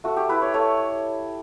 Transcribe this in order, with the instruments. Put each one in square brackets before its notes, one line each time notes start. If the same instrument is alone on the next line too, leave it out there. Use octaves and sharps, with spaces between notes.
[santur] A3 F#4
G4
E4 B4
C#5
A3 C#5